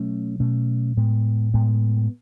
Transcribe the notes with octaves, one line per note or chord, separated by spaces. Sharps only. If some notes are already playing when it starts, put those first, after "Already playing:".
Already playing: B2 F#3 A3 C#4
B2 F#3 A3 C#4
A2 G#3 B3
A2 G#3 B3